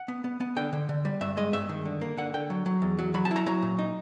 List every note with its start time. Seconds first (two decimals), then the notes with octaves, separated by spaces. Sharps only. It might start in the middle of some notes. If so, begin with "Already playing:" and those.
Already playing: F#5
0.08 B3
0.24 B3
0.40 B3
0.56 D3 G5
0.73 D3
0.89 D3
1.05 G3
1.21 G2 E5
1.37 G#3 D#5
1.53 G2 E5
1.69 D#3
1.85 D3
2.01 A#3
2.17 D3 F#5
2.34 D3 G5
2.50 F#3
2.66 F#3
2.82 E2
2.99 F#3
3.14 F#3 B5
3.25 A5
3.31 E4 A#5
3.46 F#3 A#5
3.62 A#2
3.79 D#4